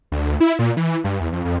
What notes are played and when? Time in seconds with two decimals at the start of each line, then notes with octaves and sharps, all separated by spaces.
0.12 D2
0.40 E4
0.59 A#2
0.77 E3
1.04 G2
1.20 E2
1.32 F2
1.45 F2